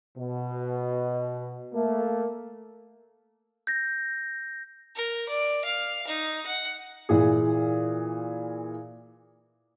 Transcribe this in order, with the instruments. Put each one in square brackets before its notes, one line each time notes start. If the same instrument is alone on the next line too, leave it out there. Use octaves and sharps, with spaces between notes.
[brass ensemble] B2
A3 A#3
[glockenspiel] G6 A#6
[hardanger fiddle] A#4
D5
F5
D#4
F#5
[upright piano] A#2 E3 G#4